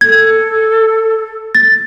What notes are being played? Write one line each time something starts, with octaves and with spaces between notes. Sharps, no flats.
A4 G#6
A6